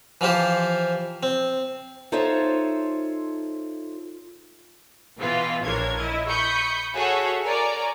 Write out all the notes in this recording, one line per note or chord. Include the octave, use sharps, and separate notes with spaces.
E3 F3 F4 G4 C5
C4
D#4 F4 A4 C5 C#5 E5
B2 E3 B3 F4 B4
A#1 D4 A#4 C#5 G#6
E4 D#5
B5 C#6 D#6 G6 C#7
F#4 G#4 A4 C#5 E5 F#5
A#4 C#5 D5 G#5 A#5